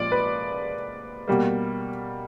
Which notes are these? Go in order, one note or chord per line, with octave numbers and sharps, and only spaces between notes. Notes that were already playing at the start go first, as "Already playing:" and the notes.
Already playing: A#2 F3 G#3 D5
B4
B2 G3 A#3